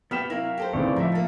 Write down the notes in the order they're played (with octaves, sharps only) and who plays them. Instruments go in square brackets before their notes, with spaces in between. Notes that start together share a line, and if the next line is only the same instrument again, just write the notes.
[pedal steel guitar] B3 [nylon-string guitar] F#4 G4 G5 [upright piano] F6 B6 E7
[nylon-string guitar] C3 G3 E4 [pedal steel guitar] F#3 A#4 F5
[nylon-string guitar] G4 A4 C5
[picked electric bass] D2 G#2 [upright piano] C#3 E3 C4 [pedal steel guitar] C#5 D5
[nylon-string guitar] A2 D#4 [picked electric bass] F3 [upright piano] E5 A#5
[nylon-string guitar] A#3 D4 [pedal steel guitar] A4